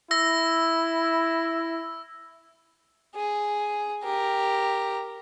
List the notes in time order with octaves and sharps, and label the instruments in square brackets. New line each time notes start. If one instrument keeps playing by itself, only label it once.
[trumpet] E4 [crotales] E6 A#6
[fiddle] G#4
G4 A#4